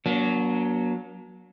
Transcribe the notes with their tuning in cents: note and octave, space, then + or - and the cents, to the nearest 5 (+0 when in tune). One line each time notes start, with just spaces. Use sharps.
F#3 +0 A#3 +40 D4 -35